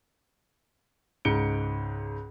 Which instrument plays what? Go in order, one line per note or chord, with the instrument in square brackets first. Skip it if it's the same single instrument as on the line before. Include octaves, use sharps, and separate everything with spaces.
[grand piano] C#2 G#2 C#7 D7 G7